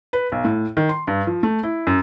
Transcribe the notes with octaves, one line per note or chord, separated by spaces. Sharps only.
B4
B1
A2
D#3
C6
G2
F3
A3
E4
F#2